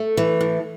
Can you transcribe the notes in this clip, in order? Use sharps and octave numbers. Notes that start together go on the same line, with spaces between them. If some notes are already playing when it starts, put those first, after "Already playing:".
Already playing: A3
E3
A2